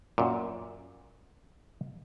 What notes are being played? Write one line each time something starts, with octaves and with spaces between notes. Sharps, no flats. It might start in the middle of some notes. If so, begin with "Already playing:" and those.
F#2 A#2